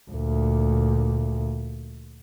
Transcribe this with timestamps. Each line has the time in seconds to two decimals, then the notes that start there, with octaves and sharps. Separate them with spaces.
0.11 D2 A#2